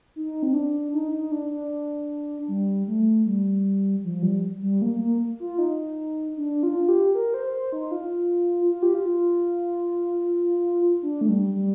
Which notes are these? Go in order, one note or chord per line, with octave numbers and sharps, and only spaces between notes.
D#4
C4
D4
D#4
D#4
D4
D4
G3
A3
G3
F3
G3
G3
A#3
A#3
F4
D#4
D4
F4
G4
A#4
C5
C5
D#4
F4
F4
G4
F4
D4
A3
G3
G3